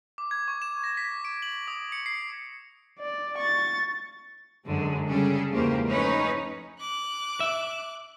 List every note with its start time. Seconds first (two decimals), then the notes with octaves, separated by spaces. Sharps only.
0.18 D6
0.31 G#6
0.48 C#6
0.62 E7
0.84 A#6
0.97 B6
1.25 D7
1.42 F#7
1.68 D#6
1.92 C#7
2.06 C7
2.99 D5
3.38 C#6 A6
4.65 F#2 D3 G#3
5.07 C#3 G3 C#4 G#4 A4
5.52 E2 G#2 C#3 A#3 G4 C5
5.85 F3 A3 C#4 D#4 B4 C#5
6.80 D6 F#6
7.40 E5